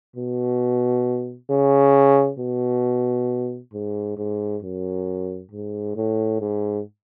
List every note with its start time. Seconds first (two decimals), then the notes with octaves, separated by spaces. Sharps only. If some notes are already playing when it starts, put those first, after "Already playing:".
0.16 B2
1.51 C#3
2.39 B2
3.73 G#2
4.17 G#2
4.62 F#2
5.51 G#2
5.96 A2
6.40 G#2